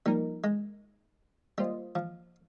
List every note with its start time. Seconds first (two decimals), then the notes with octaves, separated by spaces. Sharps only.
0.06 F3 G3 A#3 D#4 A#4
0.44 G#3
1.58 G3 A#3 F4 C5 D#5
1.95 F3